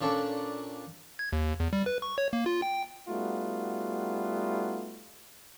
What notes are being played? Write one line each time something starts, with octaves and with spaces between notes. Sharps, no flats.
A#2 C#4 D4 A4 C#6
G#6
D#2
E2
G3
B4
C#6
C#5
A#3
F4
G5
G3 A3 B3 D#4 F4 F#4